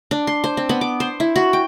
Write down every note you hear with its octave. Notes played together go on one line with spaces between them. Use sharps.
D4
C6
C5
C4
B3
D6
C5
E4
F#4
G5